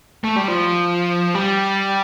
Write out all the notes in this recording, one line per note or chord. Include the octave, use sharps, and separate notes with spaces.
A3
G3
F3
G3